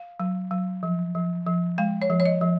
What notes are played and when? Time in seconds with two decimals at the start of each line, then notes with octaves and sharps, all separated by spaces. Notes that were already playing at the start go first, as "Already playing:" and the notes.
Already playing: F5
0.20 F#3
0.51 F#3
0.83 F3
1.15 F3
1.47 F3
1.78 G#3 F5
2.02 C#5
2.10 F3
2.20 C#5
2.26 D#5
2.41 F3